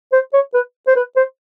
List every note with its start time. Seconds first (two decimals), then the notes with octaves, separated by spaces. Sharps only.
0.13 C5
0.33 C#5
0.54 B4
0.87 C5
0.96 B4
1.16 C5